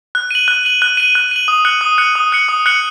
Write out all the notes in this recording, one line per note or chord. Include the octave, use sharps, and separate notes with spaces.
F#6
D#7 F#7
F#6
D#7 F#7
F#6
D#7 F#7
F#6
D#7 F#7
D#6
F#6 C#7 F#7
D#6
F#6 C#7 F#7
D#6
F#6 C#7 F#7
D#6
F#6 C#7 F#7